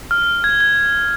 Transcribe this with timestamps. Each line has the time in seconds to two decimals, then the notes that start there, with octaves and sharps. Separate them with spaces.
0.11 F6
0.44 G#6
0.61 G#6